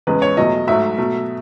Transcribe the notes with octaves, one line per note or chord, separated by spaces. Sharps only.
E2 C#3 G#3 B4
C#5
E2 B2 F#3 A3 D#5
G#2 F#3 A3 E5
B2 F#3 A3